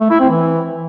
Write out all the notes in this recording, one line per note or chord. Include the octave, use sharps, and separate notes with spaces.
A3
E4
C4
E3